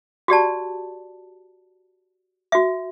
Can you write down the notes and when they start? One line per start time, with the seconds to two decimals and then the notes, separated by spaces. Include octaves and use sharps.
0.28 F#4 G4 D5 A5
2.52 F#4 E5